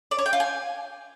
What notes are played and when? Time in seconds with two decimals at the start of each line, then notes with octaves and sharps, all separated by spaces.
0.11 D5
0.18 C#5
0.26 G5
0.33 F4
0.40 G#5